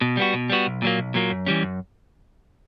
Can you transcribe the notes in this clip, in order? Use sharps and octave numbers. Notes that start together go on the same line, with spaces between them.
B2
G3 B3 F#4
B2
G3 B3 F#4
B1
A#2 F#3 A#3
B1
A#2 F#3 A#3
F#2
E3 G3 C#4
F#2